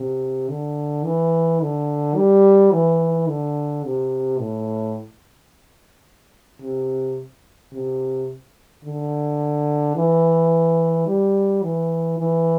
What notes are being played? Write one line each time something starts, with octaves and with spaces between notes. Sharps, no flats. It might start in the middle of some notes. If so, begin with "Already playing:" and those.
Already playing: C3
D3
E3
D3
G3
E3
D3
C3
A2
C3
C3
D3
E3
G3
E3
E3